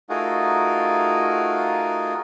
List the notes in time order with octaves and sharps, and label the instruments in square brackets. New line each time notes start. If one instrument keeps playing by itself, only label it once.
[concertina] A3 D#4 F4 F#4 G#4 A#4